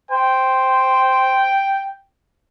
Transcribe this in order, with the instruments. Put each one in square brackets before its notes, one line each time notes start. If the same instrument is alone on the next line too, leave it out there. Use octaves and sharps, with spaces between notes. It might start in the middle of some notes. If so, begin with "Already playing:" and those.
[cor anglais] C5 [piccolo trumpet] G5